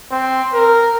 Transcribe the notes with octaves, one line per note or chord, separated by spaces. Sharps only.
C4
A#4